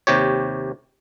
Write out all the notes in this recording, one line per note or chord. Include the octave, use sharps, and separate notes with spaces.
D#2 C3 G4 C#5